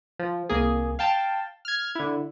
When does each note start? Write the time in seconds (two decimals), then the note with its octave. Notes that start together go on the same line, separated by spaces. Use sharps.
0.19 F3
0.49 C2 A#3 G#4
0.99 F5 G5 A5
1.65 F6 G#6
1.95 D3 E4